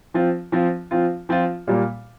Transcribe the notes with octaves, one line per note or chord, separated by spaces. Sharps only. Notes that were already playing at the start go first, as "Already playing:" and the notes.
F3 C4 F4
F3 C4 F4
F3 C4 F4
F3 C4 F4
A#2 G3 A#3